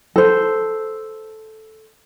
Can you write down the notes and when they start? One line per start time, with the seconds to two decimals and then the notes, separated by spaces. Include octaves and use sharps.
0.16 A4 C5